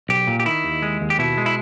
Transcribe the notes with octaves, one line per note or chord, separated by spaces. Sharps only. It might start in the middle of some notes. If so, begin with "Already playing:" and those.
B1 G4
A#2
G4
D#3 E4
D#2
G#3
D#2
G4
B2 E4
G#3
E4